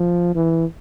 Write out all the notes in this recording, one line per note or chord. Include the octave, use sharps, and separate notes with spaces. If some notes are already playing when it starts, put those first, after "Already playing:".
Already playing: F3
E3